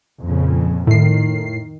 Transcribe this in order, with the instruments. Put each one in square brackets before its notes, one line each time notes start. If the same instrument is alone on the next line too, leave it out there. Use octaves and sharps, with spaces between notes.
[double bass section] F2 A#2 C#3
[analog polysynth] A2 C7 [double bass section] D#3